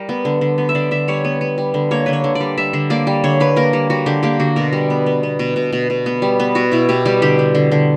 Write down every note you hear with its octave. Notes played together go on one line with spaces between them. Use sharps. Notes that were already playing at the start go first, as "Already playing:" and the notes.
Already playing: G3 G4 A#4
B3
D3
D3
B3
E5
D3 D5
D3 E5
G3 C#5
B3
B3
G3
D3
A#3 C#5
D3 B4
C#5
D3
G3 D5
G3 E5
D3
A#3 D5
G3
D3 C#5
G3 B4
A#3 A#4
G3
G3 F#4
D3 G4
A#3 G4
D3 F#4
B2 A#4
G3
B3
B3
B3
B2
B2
B2
B2
B3
G3
B3
B2 F#4
B2 E4
B2 G4
G3 G4
D3 G4
D3
D3
D3